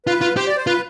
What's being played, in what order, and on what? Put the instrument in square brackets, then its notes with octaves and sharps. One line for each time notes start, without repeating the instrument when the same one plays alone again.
[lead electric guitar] F4 [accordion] B4
[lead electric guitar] F4
[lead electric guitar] G4 [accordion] C5
[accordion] D5
C5
[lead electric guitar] F4 [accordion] B4